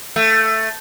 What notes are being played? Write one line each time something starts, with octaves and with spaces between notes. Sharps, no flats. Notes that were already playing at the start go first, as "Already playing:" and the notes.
A3